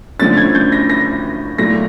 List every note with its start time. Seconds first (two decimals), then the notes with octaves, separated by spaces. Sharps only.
0.19 D3 F3 A3 C#4 A6
0.37 G#6
0.55 G6
0.72 A#6
0.90 A#6
1.58 A#2 F#3 A3 A#6